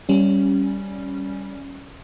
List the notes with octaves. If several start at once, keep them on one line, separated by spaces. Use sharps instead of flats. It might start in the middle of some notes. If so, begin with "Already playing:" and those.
G3 C#4